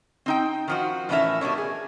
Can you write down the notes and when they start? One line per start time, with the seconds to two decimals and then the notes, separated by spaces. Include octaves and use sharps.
0.26 C4 D#4 G5
0.68 D#3 F3 F#4
1.09 A2 E3 C#4 D#4 A#4 E5
1.41 B2 G3 D4 C#5
1.58 G#4